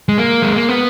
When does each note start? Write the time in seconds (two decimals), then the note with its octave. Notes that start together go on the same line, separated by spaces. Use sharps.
0.09 G#3
0.18 A#3
0.43 G#3
0.56 A#3
0.69 B3